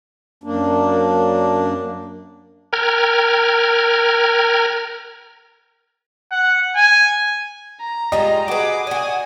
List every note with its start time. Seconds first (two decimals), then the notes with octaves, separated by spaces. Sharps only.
0.44 F#2 A#3 D4
2.73 A#4 G5 A#5 F6 G#6
6.31 F#5
6.76 G#5
7.80 A#5
8.12 G3 G#3 F4 D#5
8.48 F#4 G#4 B4 D6
8.87 D4 F#4 G#5 D#6